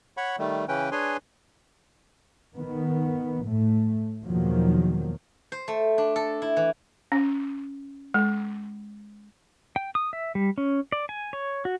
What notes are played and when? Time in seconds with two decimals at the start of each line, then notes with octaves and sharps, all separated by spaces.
0.17 C#5 F#5 B5 C#6
0.38 D#3 G3 A3
0.68 C#3 E3 C#4 B4 G5
0.92 D4 G#4 B4 C#5 G#5 C6
2.56 D#3 B3
3.45 A2 A3
4.26 E2 B2 D#3 F3 F#3 A#3
5.52 C5
5.68 A3
5.98 D4
6.16 A4
6.42 E4
6.57 E3
7.12 C#4
8.14 G#3
9.76 G5
9.95 D#6
10.13 E5
10.35 G3
10.58 C#4
10.92 D5
11.09 G#5
11.33 C#5
11.65 F#4